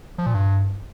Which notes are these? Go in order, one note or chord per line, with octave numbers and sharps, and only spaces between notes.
F3
A#2
G2